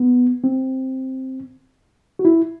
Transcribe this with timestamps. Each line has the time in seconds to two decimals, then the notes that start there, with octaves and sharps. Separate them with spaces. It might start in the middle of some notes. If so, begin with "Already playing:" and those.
Already playing: B3
0.44 C4
2.19 F#4
2.25 E4